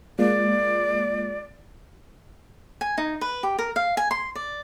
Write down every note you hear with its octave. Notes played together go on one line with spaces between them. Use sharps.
G#3 A#3 F4 D5
G#5
D#4
B4
G4
A#4
F5
G#5
C6
D5